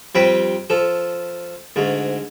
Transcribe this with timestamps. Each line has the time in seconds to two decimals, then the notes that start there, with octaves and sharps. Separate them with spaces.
0.15 F2 G3 C4 G5 B5
0.70 F3 A4
1.76 D2 G#2